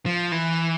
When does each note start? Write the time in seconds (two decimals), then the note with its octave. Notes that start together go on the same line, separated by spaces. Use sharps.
0.06 F3
0.32 E3